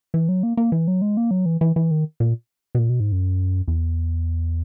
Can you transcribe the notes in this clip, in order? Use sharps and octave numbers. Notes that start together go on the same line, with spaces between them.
E3
F#3
A#3
A#3
E3
F#3
G#3
A#3
F#3
E3
E3
E3
D#3
A#2
B2
A#2
B2
G#2
F#2
E2